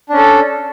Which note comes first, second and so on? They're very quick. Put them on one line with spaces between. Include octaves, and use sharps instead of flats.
D4 C#4 A4